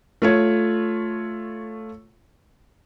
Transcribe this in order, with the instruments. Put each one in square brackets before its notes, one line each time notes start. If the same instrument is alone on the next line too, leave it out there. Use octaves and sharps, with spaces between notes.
[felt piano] A3 F4 C#5